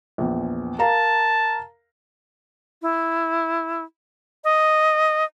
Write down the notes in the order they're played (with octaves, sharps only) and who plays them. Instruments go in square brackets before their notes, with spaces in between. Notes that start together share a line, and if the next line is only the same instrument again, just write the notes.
[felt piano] A#1 E2
[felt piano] A#4 F5 A#5 [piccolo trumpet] A5
[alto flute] E4
D#5